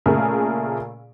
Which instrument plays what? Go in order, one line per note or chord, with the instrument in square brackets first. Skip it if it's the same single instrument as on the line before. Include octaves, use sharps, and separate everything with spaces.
[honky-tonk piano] A#2 C#3 A3 G#4 A#4